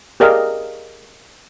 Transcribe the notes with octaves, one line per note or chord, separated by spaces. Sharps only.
G4 G#4 A#4 D5 D#5 F5